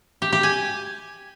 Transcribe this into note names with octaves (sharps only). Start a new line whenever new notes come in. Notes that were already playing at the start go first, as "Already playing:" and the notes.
G4
G4
G#5